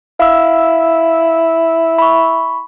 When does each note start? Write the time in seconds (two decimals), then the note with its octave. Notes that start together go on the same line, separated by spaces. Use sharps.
0.20 E4 F5 E6
1.98 B5 C#6